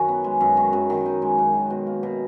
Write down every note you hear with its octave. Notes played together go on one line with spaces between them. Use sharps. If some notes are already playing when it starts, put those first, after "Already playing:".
Already playing: F#2 D#3 C#4 F#4
B3
G#3
F#2
D#3
F#2
D#3
D#4
G#3
F#2
D#3
B2
A#3
B2